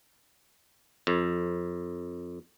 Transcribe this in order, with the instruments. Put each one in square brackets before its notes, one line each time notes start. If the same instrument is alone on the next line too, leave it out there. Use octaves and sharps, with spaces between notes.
[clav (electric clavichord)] F2